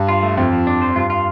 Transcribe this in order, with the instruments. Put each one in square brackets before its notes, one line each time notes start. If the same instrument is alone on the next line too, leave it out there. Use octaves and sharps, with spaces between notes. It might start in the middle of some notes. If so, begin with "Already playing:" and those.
Already playing: [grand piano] G2
[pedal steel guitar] F4
A3
[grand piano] F2 [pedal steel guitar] F3
[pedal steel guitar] F3
D4
C5
[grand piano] G2 [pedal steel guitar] F4
[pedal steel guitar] F4